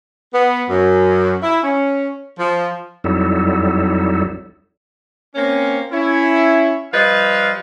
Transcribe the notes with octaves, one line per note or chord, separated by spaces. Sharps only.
B3
F#2
E4
C#4
F3
F2 F#3 G3 D#4 E4 A4
A#3 C4 C#4
C#4 E4
F3 G3 B4 D#5 F5